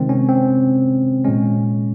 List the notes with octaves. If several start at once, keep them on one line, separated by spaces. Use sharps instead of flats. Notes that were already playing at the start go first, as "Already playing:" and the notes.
Already playing: C3 D#3 G#3 C4
C#4
C4
A#2 G#3 C#4